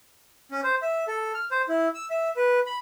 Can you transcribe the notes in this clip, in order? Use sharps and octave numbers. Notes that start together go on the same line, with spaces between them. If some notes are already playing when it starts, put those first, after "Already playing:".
C#4
C5
E5
A4
F6
C5
E4
E6
E5
B4
B5